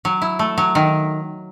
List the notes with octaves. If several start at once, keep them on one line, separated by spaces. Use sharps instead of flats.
F#3
E4
A3
F#3
D#3